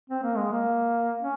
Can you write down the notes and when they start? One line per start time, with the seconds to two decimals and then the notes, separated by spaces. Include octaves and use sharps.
0.10 C4
0.23 A#3
0.37 G#3
0.52 A#3
1.21 C#4